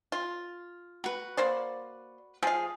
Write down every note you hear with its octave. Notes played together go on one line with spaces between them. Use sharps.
F4
F#4 B4
A#3 C5 D5
F3 G#4 F5